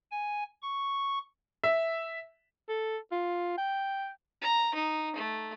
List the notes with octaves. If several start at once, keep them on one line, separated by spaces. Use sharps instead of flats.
G#5
C#6
E5
A4
F4
G5
A#5
D#4
A3